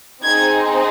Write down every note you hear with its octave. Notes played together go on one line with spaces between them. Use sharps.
C4 D#4 G#4 G#6